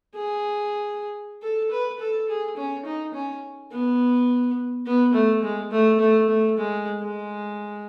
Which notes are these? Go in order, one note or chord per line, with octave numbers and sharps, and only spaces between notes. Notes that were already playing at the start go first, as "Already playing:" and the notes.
G#4
A4
B4
A4
G#4
C#4
D#4
C#4
B3
B3
A3
G#3
A3
A3
A3
G#3
G#3